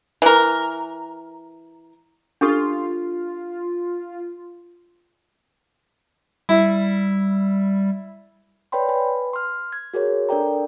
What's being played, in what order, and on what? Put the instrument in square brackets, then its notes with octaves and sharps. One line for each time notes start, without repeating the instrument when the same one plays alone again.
[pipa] E3 A#4
[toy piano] D4 G4 A4 [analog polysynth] F4
[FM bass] G3 [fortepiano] E4
[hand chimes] B4 C#5 D5 G5 B5 C6
B4 G#5 B5
C6 F6
G#6
F#4 G#4 A#4 C#5
D4 A4 A#4 D5 G5 A#5